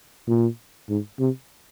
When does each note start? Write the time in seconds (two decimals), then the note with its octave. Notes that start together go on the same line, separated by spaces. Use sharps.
0.28 A#2
0.89 G#2
1.19 C3